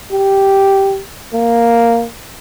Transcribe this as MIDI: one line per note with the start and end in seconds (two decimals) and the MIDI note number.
0.12 1.01 67
1.34 2.05 58